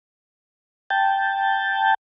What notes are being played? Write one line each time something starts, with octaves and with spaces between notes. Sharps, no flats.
G5 A5